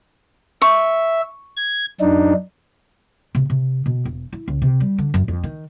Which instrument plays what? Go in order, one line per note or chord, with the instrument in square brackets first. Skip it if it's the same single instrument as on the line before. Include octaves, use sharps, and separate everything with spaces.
[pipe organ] E5 [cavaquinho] C#6
[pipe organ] G#6
F#2 D4 D#4
[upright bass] C3
C3
B2
E1
E4
C#2
C3
G3
D3
F#2
F2
D#3